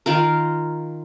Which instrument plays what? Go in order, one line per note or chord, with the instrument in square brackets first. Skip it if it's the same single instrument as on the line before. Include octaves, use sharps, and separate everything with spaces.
[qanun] D#3 F4 A#4